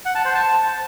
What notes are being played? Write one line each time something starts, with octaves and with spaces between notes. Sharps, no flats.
F#5
A5
C5
A5